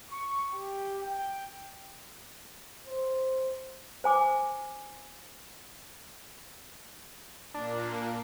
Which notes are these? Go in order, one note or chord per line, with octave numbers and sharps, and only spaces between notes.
C#6
G4
G5
C5
C5 G#5 D6
A#2 A#3 D4